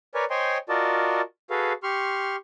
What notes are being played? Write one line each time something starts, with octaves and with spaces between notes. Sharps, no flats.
A#4 B4 C#5 D5 G#5
C5 C#5 D#5 G5 G#5 C6
F4 F#4 A#4 D5 D#5 A5
F#4 G#4 A4 B4 F5
G4 C6 C#6 F6